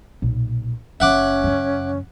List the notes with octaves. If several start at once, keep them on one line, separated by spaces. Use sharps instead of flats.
B1 A#2
F#1 C#3 C#4 E5 F#5 D6
F#2 C#3